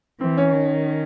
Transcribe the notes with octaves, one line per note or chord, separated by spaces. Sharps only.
E3 C4
C#4
D#3